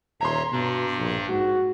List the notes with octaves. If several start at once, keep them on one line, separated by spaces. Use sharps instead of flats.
D#1 C#5 E5 A#5 C6
G2 B2 D4
A#1
G#2 F#4